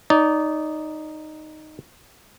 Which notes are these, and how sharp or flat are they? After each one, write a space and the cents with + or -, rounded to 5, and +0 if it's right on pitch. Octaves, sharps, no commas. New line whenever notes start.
D#4 -5 D5 -25